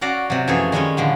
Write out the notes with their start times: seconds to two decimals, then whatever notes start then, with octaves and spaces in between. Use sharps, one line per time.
0.01 C#4 F#4 D5 F5 A#5
0.30 C3 F#3
0.47 F#2 E3 F3 A3 G#4 C#5
0.72 D#3 G3 G#3 C#4 C#5 G#5
0.97 A2 D3 F3 G3